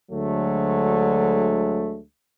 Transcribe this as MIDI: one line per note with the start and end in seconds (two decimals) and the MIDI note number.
0.12 2.02 38
0.12 2.02 50
0.12 2.02 54
0.12 2.02 56
0.12 2.02 57